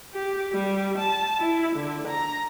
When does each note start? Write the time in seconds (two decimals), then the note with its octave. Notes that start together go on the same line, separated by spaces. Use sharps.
0.14 G4
0.53 G3
0.98 A5
1.40 E4
1.76 D3
2.08 A#5